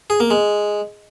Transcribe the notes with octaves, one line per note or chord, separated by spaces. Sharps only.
G#4
A#3
G#3